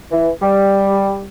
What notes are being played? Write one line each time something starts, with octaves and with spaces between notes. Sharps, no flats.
E3
G3